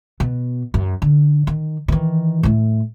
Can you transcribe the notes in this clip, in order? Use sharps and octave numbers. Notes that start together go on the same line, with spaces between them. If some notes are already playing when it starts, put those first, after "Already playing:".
B2
F#2
D3
D#3
D#3 E3
A2 A3